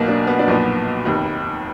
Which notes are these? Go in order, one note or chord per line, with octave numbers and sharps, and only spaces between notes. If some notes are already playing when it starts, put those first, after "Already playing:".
Already playing: B1 B2 A#3
D4
B3
D4
B1 A#2 F3 B3
F1 D#2 D#3